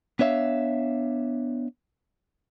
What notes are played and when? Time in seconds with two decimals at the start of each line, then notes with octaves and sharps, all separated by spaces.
0.19 B3 D4 C#5 E5 F5